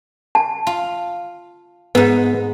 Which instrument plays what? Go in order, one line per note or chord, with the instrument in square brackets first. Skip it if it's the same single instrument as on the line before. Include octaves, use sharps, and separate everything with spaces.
[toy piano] A5
[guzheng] F4
[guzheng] G#2 D#4 [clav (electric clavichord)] B3